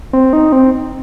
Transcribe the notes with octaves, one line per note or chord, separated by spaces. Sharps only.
C4
D#4
C4